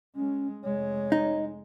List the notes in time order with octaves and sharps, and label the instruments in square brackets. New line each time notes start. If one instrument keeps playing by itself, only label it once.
[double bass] G#3 [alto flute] C#4
[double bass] F1 G#3 [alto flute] C#5
[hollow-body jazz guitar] D#4